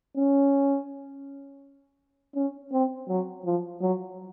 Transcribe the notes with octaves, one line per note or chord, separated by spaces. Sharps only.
C#4
C#4
C4
F#3
F3
F#3